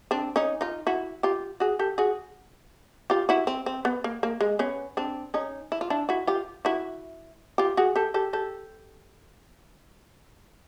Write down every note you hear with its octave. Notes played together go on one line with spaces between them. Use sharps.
C4 D4
C#4 D#4
D#4 F4
E4 F#4
F4 G4
F#4 G#4
G4 A4
F#4 G#4
F4 G4
E4 F#4
C4
C4
B3
A#3
A#3
G#3
B3 C#4
C4 D4
C#4 D#4
E4
F4
D4 E4
E4 F#4
F4 G4
E4 F#4
F4 G4
F#4 G#4
G4 A4
G4 A4
G4 A4